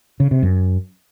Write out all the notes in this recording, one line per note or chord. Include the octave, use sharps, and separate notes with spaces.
C#3
C3
F#2